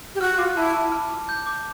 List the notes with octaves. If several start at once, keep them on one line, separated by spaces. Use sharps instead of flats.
G4
F#4 F6
F4 D6
E4 A5
A5
F6
D6
G6
D6